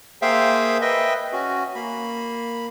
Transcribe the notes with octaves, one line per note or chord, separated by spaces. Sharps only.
A#3 G#4 C5 E5 F5 G5
B4 D#5 E5 G5
C#4 F#4
A#3 B5